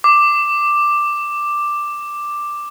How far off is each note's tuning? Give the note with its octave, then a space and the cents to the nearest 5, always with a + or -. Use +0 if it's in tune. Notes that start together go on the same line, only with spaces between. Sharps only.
D6 +5